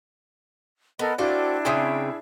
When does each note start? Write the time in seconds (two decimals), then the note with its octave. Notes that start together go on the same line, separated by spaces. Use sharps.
0.99 B3 A4 A#4 D#5
1.18 A3 C4 D4 E4 F#4 D5 F5
1.65 C#3 C4 G#4 E5 G5 D#6